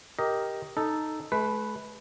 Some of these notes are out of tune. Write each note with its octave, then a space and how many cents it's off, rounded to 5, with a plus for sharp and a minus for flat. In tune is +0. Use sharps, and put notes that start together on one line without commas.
G4 +0 A#4 +0 D#5 +10
D#4 -5 A4 +0
A3 -45 B4 +0